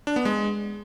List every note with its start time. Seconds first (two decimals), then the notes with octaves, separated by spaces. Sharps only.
0.07 D4
0.16 B3
0.25 G#3